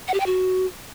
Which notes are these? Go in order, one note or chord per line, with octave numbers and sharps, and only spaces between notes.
F#5
G4
G5
F#4